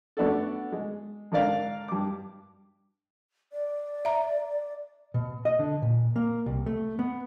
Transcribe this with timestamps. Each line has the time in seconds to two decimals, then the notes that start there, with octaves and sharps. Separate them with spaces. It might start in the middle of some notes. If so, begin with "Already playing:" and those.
0.17 A3 B3 D4 F#4 A4
0.72 G#3
1.32 G#2 D3 A#4 D5 F5
1.88 G2 D6
3.53 D5
4.05 E5 A#5
5.14 B2
5.45 D#5
5.59 D3
5.82 A#2
6.16 A#3
6.46 C2
6.66 A3
6.99 B3